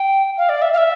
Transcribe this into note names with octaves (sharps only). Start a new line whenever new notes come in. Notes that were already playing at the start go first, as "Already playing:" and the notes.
Already playing: G5
F5
D5
E5
F5
E5